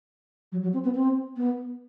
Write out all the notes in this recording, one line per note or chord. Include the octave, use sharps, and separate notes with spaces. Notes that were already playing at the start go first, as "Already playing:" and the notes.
F#3
F#3
C4
B3
C4
B3